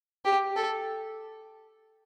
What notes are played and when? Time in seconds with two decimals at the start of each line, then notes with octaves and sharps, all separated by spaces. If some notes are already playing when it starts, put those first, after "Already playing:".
0.25 G4
0.56 A4